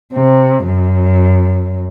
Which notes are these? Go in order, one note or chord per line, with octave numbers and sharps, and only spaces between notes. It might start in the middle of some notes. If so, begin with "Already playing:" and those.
C3
F#2